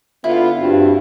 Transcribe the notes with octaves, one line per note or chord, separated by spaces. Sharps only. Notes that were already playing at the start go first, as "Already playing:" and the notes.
D3 B3 E4 F4
G2 C4 F4 F#4